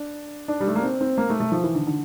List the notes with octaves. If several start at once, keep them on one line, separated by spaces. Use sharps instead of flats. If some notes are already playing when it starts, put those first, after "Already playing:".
Already playing: D4
D4
G3
A3
A#3
C4
C4
A#3
A3
A3
F3
E3
D3
D3